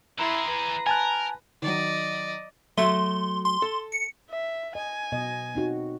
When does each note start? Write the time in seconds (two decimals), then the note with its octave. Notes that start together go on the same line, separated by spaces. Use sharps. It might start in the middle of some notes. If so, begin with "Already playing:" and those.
0.18 E3 E4 G#4 A#5 C6
0.49 B4
0.87 A#4 G#5 A5 F#6
1.62 D#3 F#3 D5 D#5
2.77 F#3 A3 E5 C6
3.45 C6
3.62 A4
3.92 C#7
4.29 E5
4.75 D#5 G#5
5.12 B2 D#5
5.55 C4 D#4 F#4